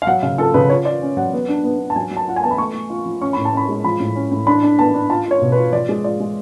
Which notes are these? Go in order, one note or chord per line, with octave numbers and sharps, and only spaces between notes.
F5
F#3 F#5
C#3 F5
F4 A4
C#3 B4
F4 C#5
F4 D5
C#4
F#3 F#5
B3
D4
B3
D4
A5
F#3 G#5
F#3
A5
F4 F#5
G#5
B3 A5
B5
A3 C#6
A3
F4
F3
C#4 C#6
A2 B5
A5
C#4 B5
G#3
F3 B5
A2
C#4
A2
D4 B5
D4
B3 A5
D4
F4 A5
F4
C#5
B2
B4
F4
F3 D5
G#3
F4 D5
G#3